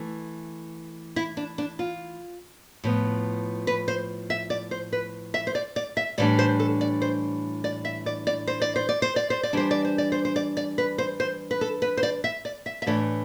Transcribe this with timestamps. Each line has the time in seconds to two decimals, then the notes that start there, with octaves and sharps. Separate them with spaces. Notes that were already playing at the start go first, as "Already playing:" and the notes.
Already playing: E3 A3
1.16 E4
1.37 D4
1.58 D4
1.79 F4
2.84 A2 F3 B3
3.67 B4
3.88 C5
4.30 E5
4.50 D5
4.71 C5
4.93 B4
5.34 E5
5.47 C5
5.55 D5
5.76 D5
5.97 E5
6.18 A2 E3 G3 D4 D5
6.39 C5
6.60 A4
6.81 D5
7.02 C5
7.64 D5
7.85 E5
8.06 D5
8.27 D5
8.47 C5
8.62 D5
8.76 C5
8.89 D5
9.02 C5
9.16 D5
9.30 C5
9.43 D5
9.53 E3 G3 D4 C5
9.71 D5
9.85 C5
9.98 D5
10.12 C5
10.25 C5
10.36 D5
10.57 D5
10.78 B4
10.98 C5
11.20 C5
11.51 B4
11.61 A4
11.82 B4
11.97 C5
12.03 D5
12.24 E5
12.45 D5
12.66 E5
12.82 E5
12.86 A2 E3 A3 D4 D5